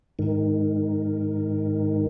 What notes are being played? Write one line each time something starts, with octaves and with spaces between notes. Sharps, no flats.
G#2 D#3